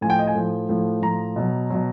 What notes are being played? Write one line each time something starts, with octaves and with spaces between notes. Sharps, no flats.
A2 F3 G#5
G5
D#5
G#5
A2 F3
A2 F3
A2 F3 A#5
B2 F#3
B2 F#3